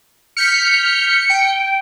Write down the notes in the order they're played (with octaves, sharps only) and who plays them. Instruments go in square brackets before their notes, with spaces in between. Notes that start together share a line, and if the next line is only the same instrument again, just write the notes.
[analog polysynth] F6 G6 B6 [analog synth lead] C#7
[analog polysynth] G5